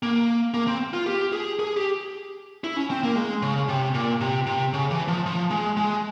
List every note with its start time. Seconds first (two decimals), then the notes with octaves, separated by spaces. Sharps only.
0.03 A#3
0.54 A#3
0.67 C4
0.94 F4
1.06 G4
1.32 G#4
1.59 G#4
1.77 G4
2.64 E4
2.76 C#4
2.90 C4
3.03 A#3
3.16 G#3
3.42 C#3
3.69 C3
3.94 A#2
4.21 C3
4.46 C3
4.73 C#3
4.91 E3
5.08 F3
5.26 F3
5.51 G#3
5.77 G#3